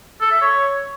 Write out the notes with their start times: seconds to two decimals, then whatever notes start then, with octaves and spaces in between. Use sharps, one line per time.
0.21 A4
0.31 E5
0.42 C#5